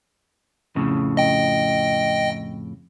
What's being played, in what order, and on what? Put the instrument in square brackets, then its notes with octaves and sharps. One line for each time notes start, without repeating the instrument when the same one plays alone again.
[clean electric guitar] F2 A2 C#3
[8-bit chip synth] D#5 G5